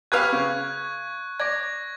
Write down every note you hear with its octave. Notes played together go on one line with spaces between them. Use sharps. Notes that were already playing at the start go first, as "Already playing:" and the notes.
G4 B4 F5 C#6 F#6 G#6
C#3
D5 G#6 A#6